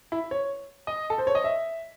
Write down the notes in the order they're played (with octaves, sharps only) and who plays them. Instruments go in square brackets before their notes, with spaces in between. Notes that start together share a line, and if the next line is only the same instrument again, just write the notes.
[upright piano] E4
C#5
D#5
A4
C5
C#5
D#5
E5